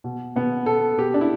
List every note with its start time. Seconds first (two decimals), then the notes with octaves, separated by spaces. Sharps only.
0.04 B2
0.36 B2 B3
0.66 B2 A4
0.98 B2 G4
1.14 D4
1.21 E4